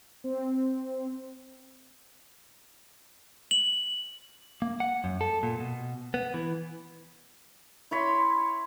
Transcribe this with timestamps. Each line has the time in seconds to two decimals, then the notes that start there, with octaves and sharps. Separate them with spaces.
0.24 C4
3.51 F#7
4.62 A#3
4.80 F#5
5.04 F#2
5.21 A4
5.43 A#2
5.60 B2
6.14 B3
6.34 E3
7.91 E4 C#5 B5 C6